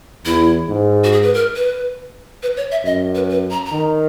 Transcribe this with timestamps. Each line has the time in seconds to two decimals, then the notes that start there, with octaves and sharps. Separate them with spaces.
0.25 E2 E4
0.68 G#2
1.04 F#4
1.12 G#4
1.23 B4
1.34 A#4
1.56 B4
2.43 B4
2.57 C#5
2.71 E5
2.85 F#2 D#5
3.15 B4
3.29 B4
3.51 A#5
3.66 A#5
3.72 D#3